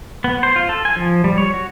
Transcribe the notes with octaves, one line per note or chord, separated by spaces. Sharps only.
B3
C5
F4
A4
G#5
F3
G3
C#5
F#4